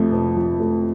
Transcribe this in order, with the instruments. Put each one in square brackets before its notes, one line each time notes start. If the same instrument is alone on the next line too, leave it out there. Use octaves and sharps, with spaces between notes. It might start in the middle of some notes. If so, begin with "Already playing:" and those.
Already playing: [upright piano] F2 F3 A3
F1
F3
A3